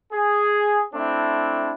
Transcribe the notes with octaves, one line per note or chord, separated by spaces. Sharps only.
G#4
A3 C4 D4 E4